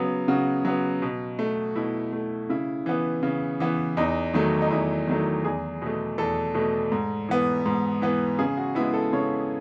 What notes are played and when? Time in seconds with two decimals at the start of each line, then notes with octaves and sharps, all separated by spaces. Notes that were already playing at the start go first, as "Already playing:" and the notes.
Already playing: C#3 F#3 B3
0.28 C#3 F#4
0.65 F#3 B3
1.02 B2
1.39 A3
1.76 B2 E4
2.13 A3
2.49 C#3 E4
2.86 E3 B3
3.23 C#3
3.60 E3 B3
3.97 E2 D#4
4.33 D#3 F#3 A3
4.62 D#4
4.70 E2 E4
5.07 D#3 F#3 A3
5.44 E2 G#4
5.82 B2 A3
6.18 E2 A4
6.54 B2 A3
6.92 G#2
7.29 E3 B3
7.66 G#2
8.02 E3 B3
8.39 C#3 G#4
8.57 F#4
8.75 G#3 B3 E4
8.94 A4
9.13 C#3 C#5